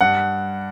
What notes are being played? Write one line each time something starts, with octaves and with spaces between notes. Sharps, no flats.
G2 F#5